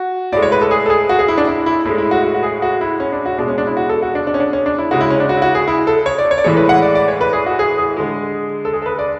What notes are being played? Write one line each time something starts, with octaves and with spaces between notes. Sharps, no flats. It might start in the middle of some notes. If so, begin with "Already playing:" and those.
Already playing: F#4
A2 G#3 D5
C#5
B4
A4
G#4
A4
G#4
F#4
G#4
E4
D4
E4
E4
A2 G#3 E4
E4
F#4
F#4
F#4
G#4
F#4
E4
C#4
D4
F#4
B2 G#3 D4
C#4
D4
E4
F#4
A4
F#4
D4
D4
C#4
D4
C#4
D4
E4
C#3 G#3 F#4
E4
C#4
D4
F#4
E4
F#4
G#4
E4
A4
C#5
D5
C#5
D5
A2 E3 G#3 C#5
B4
F#5
D5
D5
C#5
B4
G#4
F#4
G#4
G#4
D3 G#3
A4
G#4
A4
B4
D5